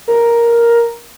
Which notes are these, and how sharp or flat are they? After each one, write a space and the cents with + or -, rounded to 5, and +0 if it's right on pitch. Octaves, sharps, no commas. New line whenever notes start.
A#4 +5